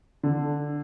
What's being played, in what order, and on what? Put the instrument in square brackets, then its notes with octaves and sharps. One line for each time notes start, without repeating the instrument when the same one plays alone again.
[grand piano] D3